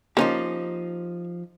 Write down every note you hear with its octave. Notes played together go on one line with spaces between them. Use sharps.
F3 A#3 C#4 D#4 F4 G4